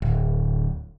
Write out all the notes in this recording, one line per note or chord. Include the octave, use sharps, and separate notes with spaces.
D1